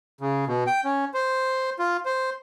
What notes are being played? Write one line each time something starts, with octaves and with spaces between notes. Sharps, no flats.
C#3
B2
G5
C#4
C5
F4
C5